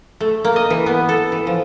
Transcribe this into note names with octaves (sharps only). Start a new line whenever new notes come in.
A3
A#3
D#5
E3
B3
A4
E3
F3